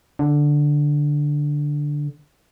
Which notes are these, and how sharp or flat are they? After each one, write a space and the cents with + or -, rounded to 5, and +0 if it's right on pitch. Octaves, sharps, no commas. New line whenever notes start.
D3 +0